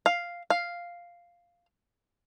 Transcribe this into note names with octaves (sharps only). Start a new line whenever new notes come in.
F5
F5